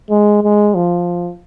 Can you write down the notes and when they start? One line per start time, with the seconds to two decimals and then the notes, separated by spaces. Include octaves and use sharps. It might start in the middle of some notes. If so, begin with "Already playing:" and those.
0.11 G#3
0.43 G#3
0.75 F3